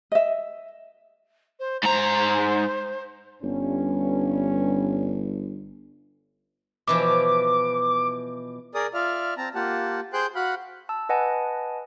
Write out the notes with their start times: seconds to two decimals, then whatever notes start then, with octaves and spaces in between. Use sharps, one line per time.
0.12 D#5 E5
1.59 C5
1.84 G#2 C5 A#5
3.43 G1 G2 C#4
6.87 B2 E3 F3 D6
8.75 G#4 A#4 D5 D#6
8.94 F4 D5 E5 F5 F6
9.37 C4 A5 A#5
9.55 A#3 F4 G4 F#5 A5
10.13 G#4 C5 G5 C6 F#6 G6
10.35 F#4 F5 F#5 B5 F#6
10.89 A5 E6
11.09 B4 D#5 F#5 G#5 A5